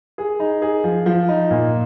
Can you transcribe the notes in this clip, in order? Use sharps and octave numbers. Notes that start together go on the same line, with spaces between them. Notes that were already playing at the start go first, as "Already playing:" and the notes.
G#4
D#4
G#4
F3
F3
D#4
A#2